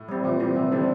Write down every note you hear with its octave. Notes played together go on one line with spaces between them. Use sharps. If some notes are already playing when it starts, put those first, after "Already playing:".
Already playing: A2
G3 C4
A#2 E3
G3 C4
C3 E3
D3 G3 C4